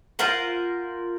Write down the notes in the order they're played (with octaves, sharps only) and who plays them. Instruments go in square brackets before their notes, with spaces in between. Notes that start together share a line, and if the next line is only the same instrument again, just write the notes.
[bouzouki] F4 A#4 C5 F#5